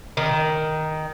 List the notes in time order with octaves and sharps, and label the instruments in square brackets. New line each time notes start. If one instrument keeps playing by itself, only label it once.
[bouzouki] D#3